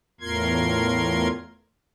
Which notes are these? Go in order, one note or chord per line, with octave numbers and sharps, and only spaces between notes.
E2 A2 F4 A#4 C6 G#6